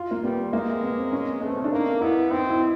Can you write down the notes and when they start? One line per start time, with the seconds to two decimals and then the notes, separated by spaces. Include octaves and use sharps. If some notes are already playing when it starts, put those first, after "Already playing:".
Already playing: F4
0.11 A#3
0.23 G3 B3
0.53 G#3 A#3
0.83 B3
0.98 C4
1.12 C#4
1.41 A3 B3
1.50 C4
1.56 C#4
1.64 D4
1.71 A#3 D#4
2.01 B3 E4
2.31 C4 D#4
2.50 E4